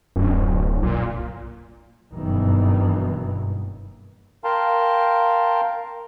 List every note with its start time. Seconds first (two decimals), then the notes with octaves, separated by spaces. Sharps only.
0.16 D1 F#2
0.83 B1 A#2
2.13 F#1 G2 B2 D#3 E3
4.44 A#4 F5 G5 A5 A#5 C6